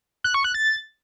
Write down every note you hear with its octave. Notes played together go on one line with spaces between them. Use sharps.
F#6
C#6
F#6
A6